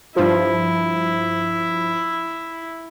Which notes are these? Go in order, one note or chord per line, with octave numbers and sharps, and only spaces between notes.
G2 F3 E4